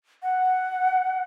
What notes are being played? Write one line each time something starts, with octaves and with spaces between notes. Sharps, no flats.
F#5